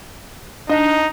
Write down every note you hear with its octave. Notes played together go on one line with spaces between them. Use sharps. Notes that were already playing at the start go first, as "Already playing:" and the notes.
D4 D#4 D#5